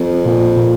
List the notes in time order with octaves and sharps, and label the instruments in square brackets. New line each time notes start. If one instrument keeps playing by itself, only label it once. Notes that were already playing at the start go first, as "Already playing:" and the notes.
Already playing: [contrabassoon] F2
[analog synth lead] A#2
A#2